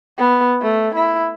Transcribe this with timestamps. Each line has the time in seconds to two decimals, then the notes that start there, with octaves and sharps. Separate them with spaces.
0.18 B3
0.62 A3
0.95 E4